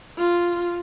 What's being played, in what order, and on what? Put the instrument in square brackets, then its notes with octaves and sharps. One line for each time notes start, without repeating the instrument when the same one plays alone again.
[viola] F4